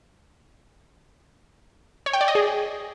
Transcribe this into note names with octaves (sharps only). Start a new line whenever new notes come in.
C#5
G5
D5
D#5
G#4